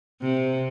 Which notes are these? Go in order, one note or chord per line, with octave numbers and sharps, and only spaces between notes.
C3